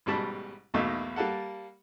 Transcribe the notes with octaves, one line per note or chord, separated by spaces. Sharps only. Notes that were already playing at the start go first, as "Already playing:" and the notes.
A1 G#2 B2 G3 A5 B5
B1 E2 B2 A3 A#3 D#4
G3 A#3 A4 F#5